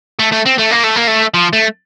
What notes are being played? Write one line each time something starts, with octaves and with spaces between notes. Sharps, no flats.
A3
A3
C4
A3
A#3
A3
A#3
A3
F3
A3